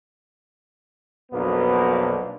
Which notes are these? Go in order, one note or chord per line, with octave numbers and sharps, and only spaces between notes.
B1 F2 B2 A#3 B3 D4